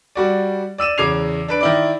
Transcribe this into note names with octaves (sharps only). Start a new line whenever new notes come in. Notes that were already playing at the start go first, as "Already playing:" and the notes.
G3 F#4 D5
D5 E6 D#7 E7
E2 C#3 D6 G#6 C7 F7
D4 B4 D7
D#3 E4 D5